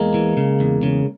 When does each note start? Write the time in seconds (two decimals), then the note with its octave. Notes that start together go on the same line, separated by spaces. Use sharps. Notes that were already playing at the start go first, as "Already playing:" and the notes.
Already playing: E2 G#3 A#3
0.14 E3
0.37 C#3
0.60 E2
0.83 C#3